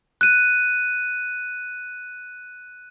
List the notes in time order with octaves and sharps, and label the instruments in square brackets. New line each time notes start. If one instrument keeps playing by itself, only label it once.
[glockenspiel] F#6 D#7